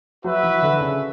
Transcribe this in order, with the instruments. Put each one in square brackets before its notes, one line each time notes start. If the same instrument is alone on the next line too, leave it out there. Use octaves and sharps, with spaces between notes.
[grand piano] F#3 [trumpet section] F#4 B4 E5
[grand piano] E3
D3
C#3